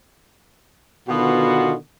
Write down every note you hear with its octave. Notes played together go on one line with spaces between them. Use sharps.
B2 D3 D#3 B3 F4 F#4